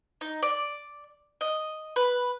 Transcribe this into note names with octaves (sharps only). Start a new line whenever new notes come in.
D#4
D5
D#5
B4